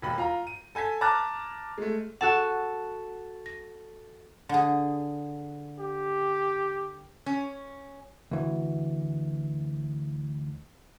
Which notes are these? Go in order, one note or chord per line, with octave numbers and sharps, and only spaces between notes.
E1 D#2 B5
F4 A#5
D#7
A4 G#5 G#6 B6
A5 A#5 D6 F6 F#6 A6
G#3 A3
F#4 A4 F#5 A5
A#6
D3 G#4
G4
C#4
D2 E3